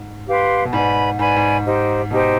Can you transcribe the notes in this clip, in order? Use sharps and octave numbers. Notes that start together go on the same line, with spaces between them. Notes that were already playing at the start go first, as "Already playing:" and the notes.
Already playing: G#2
G4 B4 F5 C6
B2
G#2 B4 D5 G#5 B5
G#2 B4 D5 G#5 B5
G#2
D#4 G4 C5
B2 D#4 G4 C5